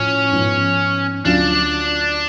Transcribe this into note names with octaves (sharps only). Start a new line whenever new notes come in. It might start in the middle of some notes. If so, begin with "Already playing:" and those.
Already playing: A2 F3 C#4 F4
G#2 F3 B3
D2 D3 F#3 C#4 D4 F4